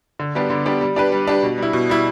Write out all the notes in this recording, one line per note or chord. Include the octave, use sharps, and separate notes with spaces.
D3
G3 B3 D4 G4
D3
G3 B3 D4 G4
G3
D4 G4 B4
G3
D4 G4 B4
B2
G3 E4
B2
G3 E4